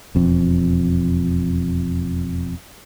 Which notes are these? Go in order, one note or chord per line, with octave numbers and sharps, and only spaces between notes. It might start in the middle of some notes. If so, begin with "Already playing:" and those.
E1 F2